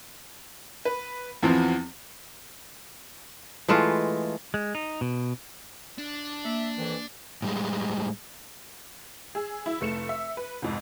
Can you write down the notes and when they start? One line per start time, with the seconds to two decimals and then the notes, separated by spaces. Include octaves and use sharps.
0.85 B4
1.43 E2 E3 F3 B3 C4
3.68 E3 G#3 A3 F4
4.54 G#3
4.75 D#4
5.01 B2
5.98 D4
6.45 A#3 E5
6.77 F2 D#3 E3
7.42 A2 G3 G#3
9.35 G#4 E6
9.66 E4 E5
9.81 F1 A3 C#7 E7
10.09 E5
10.37 B4
10.62 C2 F2 G#2